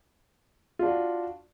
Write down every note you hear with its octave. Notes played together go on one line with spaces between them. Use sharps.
D4 F4 F#4